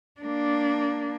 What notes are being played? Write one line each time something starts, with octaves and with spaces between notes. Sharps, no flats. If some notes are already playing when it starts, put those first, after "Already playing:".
A#3 D4